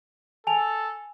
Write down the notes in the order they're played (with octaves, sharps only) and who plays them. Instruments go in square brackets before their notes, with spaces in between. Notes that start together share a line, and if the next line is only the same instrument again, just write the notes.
[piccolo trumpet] A4 [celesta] G#5 A5 F7